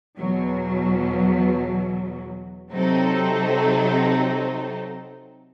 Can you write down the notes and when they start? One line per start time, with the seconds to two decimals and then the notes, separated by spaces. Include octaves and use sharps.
0.18 E2 B2 F#3
2.72 C3 F#3 C4 D#4 A4